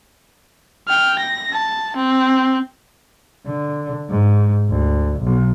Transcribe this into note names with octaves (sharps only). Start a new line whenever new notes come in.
G5 F6
A#6
A5
C4
D3
G#2
D2
B1